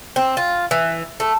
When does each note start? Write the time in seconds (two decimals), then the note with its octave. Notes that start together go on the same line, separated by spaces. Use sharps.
0.16 C4
0.37 F4
0.71 E3
1.20 A3